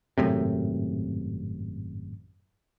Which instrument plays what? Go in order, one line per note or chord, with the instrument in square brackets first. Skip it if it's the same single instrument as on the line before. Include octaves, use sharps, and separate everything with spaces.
[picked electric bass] G#1 F#2 A2 C3